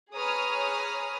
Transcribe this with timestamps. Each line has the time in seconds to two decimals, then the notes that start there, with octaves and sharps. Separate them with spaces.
0.14 G#4 B4 C#5 A#5 D#6 F6